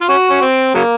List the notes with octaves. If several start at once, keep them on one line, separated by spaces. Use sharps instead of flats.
F4
C#4 F#4
C#4
C4
C#3 F#3 A#3